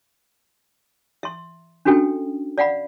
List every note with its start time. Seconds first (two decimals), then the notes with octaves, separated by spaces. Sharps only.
1.23 E5 C6
1.85 C#4 D4 F#4 A4 G5
2.58 D5 F5 F#5 B5